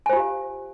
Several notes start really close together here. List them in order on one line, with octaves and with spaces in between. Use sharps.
G#5 C5 F4 G4 F5